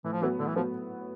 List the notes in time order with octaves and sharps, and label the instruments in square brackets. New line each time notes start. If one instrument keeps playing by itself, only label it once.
[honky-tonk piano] A2 [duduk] E3
[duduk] F3
[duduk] E3 [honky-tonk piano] F#3 B3
[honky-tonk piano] A2 [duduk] D3
[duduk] E3
[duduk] F3 [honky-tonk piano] F#3 B3